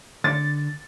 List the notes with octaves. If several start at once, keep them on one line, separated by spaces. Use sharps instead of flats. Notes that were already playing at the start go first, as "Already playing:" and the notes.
D3 A6